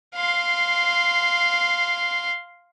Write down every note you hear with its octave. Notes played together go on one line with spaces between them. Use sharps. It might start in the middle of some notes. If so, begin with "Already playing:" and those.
F5 C6